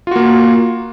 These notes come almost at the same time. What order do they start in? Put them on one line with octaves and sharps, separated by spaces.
F4 F#4 A#3